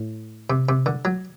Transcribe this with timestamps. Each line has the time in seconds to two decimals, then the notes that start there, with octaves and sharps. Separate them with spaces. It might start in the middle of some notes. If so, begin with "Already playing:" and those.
Already playing: A2
0.50 C3
0.69 C3
0.86 D3
1.05 F#3